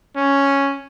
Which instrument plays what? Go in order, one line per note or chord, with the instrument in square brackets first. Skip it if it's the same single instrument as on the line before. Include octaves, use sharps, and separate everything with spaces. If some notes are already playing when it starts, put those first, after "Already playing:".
[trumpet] C#4